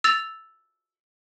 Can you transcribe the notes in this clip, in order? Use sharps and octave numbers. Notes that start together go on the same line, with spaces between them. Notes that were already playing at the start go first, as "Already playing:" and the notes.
E6 A6 F7